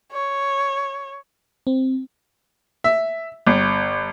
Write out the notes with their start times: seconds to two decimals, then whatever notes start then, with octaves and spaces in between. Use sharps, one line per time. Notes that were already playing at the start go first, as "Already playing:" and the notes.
0.12 C#5
1.67 C4
2.84 E5
3.46 G1